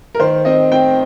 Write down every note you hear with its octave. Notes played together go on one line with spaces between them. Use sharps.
A#4
D#3 C5
C4 D#5
C4 G5